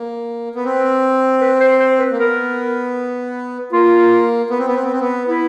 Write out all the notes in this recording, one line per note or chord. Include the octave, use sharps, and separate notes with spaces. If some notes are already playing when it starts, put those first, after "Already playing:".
Already playing: A#3
B3
C4 B4
B4
C5
C5
B4
A#3
B3 A#4
A#3 F4
B3
C4
B3
C4
B3
C4
B3
B3 E4